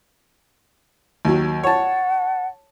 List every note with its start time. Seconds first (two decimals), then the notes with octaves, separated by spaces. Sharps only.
1.25 D#2 F#3
1.63 C#5 F#5 A5